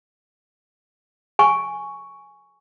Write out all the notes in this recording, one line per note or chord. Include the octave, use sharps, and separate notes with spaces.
G#5 C#6